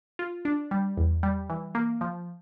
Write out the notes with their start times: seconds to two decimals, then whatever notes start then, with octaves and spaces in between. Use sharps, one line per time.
0.19 F4
0.45 D4
0.71 G3
0.97 E2
1.23 G3
1.50 E3
1.75 A#3
2.01 F3